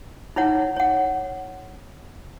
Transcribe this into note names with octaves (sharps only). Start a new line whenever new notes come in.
D#4 E4 C#5 F#5
C#5 F#5